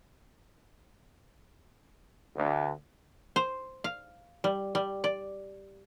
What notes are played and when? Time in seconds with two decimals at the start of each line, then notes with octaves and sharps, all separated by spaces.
2.36 D2
3.36 C5
3.84 F5
4.44 G3
4.75 G3
5.04 D5